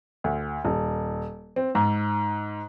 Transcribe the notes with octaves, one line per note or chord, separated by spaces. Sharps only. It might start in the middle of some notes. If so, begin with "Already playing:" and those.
D2
D#1
C4
G#2